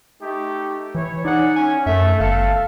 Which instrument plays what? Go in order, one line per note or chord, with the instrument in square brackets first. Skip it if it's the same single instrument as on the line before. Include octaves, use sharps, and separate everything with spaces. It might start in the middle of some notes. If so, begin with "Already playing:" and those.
[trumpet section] A3 D#4 G4
[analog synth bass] E3 [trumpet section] E4 C#5
[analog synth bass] D#4 [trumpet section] G#4 D5 F#5
[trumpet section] C#4 [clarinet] G#5
[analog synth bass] F#2 [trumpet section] A3 [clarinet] E5
[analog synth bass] G1 [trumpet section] A4 [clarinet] F5